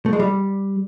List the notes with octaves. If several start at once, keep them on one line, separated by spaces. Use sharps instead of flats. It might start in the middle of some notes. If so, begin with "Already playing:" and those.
A3
G#3
G3